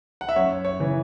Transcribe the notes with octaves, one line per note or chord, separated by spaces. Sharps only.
F#5
E5
F#2 C#5
C#5
C#3 E3